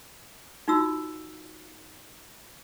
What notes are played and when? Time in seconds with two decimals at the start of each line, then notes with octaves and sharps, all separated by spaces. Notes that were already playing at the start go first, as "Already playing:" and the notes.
0.68 D#4 F4 F#4 E6